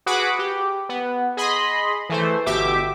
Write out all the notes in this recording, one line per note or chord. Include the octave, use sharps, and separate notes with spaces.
F#4 G#4 B4 F#5 B5 D6
G4
B3
G#4 D#5 B5 C6
E3 A3 C5
G1 B2 G4 E5 D6